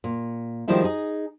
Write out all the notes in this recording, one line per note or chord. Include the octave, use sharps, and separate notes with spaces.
A#2
D#3 F3 G3 G#3 E4 F4
D#4 G#4